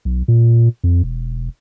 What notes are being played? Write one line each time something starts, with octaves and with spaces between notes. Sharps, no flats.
B1
A#2
F2
E1